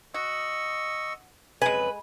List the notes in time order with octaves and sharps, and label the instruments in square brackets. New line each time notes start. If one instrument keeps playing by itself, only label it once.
[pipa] F#4 [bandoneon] D#5 C#6 E6
[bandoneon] F2 C#3 F#3 [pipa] G#3 G#5 [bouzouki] B4